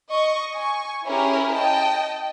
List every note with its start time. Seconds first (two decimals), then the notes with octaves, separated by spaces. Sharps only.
0.11 D#5 C#6
0.54 G#5 C#6
1.06 C#4 E4 G4 G#4 A#4
1.53 D#5 G5 A5